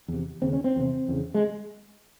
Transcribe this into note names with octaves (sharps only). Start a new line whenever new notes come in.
E2 C3
D#2 C#3 C4
C#4
C4
E2 C3
E2 C#3
G#3